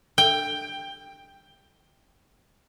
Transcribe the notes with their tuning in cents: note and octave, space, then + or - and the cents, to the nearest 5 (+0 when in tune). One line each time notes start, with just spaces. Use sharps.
G5 +10